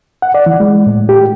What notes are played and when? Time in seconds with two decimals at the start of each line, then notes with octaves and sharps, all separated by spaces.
0.22 F#5
0.34 D5
0.46 E3
0.60 G#3
0.87 A2
1.09 G4